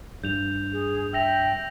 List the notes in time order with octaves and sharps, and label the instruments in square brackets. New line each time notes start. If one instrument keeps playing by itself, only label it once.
[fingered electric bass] G2 [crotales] G6 F7
[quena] G#4
[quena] E5 [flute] G5 [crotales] E6 A#6 F7